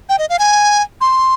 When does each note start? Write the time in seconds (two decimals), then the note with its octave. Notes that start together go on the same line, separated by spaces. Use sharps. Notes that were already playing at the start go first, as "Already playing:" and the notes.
0.09 G5
0.18 D#5
0.29 F5
0.39 G#5
1.01 C6